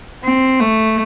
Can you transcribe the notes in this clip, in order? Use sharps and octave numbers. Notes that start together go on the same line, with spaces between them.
C4
A3